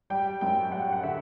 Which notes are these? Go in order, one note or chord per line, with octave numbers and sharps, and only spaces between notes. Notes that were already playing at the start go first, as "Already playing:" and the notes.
G3 G5
F#2 G5
G3 F#5
F#5
D3 E5